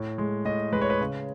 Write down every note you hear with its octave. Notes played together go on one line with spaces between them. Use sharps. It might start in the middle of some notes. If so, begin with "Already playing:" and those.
Already playing: A2
G#3
A2 D#5
G#3 B4
C#5
B4
C#3